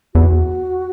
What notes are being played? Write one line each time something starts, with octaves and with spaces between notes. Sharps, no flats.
E2 F#4